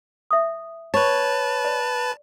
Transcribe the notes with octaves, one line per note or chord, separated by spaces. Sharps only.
E5 D#6
B4 C#5 A5
D5